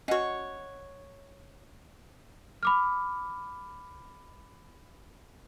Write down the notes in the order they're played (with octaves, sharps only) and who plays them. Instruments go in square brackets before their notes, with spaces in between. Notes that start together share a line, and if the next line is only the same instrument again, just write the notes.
[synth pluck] C#4 F#4 [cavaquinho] C#5 F#5 [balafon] D#5
[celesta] B5 D6 F6